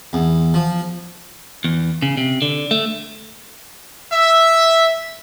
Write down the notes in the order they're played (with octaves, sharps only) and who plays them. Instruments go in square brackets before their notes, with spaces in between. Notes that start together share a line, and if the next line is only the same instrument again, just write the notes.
[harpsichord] E2
F3
[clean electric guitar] E2
C#3
C3
D3
A3
[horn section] E5